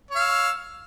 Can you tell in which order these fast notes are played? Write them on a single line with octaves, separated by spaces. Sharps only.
C#5 F5 E6